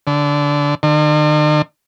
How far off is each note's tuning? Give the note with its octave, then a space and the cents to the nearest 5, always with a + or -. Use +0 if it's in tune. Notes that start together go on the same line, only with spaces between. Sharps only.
D3 -20
D3 +45